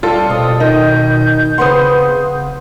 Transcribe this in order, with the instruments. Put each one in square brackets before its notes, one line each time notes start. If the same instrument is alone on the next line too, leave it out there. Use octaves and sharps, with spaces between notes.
[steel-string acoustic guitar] G3 [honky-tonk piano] F4 A4
[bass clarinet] B2 [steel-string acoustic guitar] C4 [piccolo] D#6
[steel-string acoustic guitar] D#3 [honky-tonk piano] D#4 [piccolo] G6
[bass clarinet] C#3 [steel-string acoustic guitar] C4 B4 F#5 [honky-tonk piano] C6 D#6